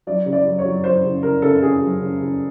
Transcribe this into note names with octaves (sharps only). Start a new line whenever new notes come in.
F#3 D5
C#3
D5
F#3
C#5
F#3
F#3 C5
C#3
C#3 A#4
C#3 A4
C#3 G#4
F#3
C#3
C#3